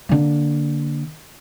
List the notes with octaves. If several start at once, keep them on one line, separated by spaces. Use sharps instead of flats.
D3 A#3